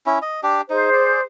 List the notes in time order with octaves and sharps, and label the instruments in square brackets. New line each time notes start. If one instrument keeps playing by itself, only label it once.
[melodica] C#4 E4
D#5
D4 G4
[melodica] D#4 [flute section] G#4 C5
[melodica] D5